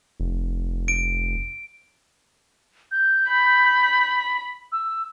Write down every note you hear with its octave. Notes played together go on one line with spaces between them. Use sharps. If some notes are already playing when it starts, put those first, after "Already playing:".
F1
D7
G6
B5
E6